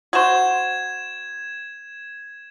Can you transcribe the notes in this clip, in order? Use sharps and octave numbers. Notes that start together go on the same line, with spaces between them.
F#4 C5 G#6 E7